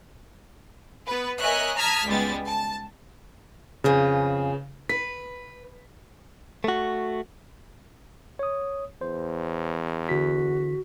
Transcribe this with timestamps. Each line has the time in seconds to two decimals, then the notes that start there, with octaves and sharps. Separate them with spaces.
1.07 B3 B4
1.40 A#4 C#5 D#5 E5 G#5 F#6
1.76 A5 A#5 D#6 F6 G#6 B6
2.06 C#2 G3 G#3 B3 A6
2.45 A5
3.84 F2 C#3 G#4 B4
4.89 B4 B6
6.64 A3 F#4
8.39 C#5 D#6
9.01 E2 C5
10.09 D3 F#4 B6